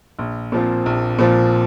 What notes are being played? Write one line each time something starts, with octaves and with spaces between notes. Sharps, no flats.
A#1
A#2 F3 C4
A#1
A#2 F3 C4